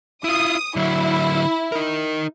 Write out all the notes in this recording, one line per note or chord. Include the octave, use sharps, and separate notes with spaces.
E4 F4 D#6
D3 F#3 E4
D#4 A#4